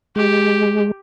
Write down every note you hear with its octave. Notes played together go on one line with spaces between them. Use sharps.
G#3 G4